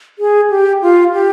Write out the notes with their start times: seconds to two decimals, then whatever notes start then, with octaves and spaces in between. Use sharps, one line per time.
0.19 G#4
0.50 G4
0.82 F4
1.13 G4